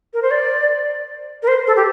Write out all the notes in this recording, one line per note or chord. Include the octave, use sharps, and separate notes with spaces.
A#4
C5
D5
A#4
C5
A4
G4